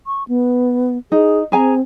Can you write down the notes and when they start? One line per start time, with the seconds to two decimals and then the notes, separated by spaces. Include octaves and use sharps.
0.07 C#6
0.28 B3
1.12 D#4 G#4
1.52 C4 G#4 G#5 A#5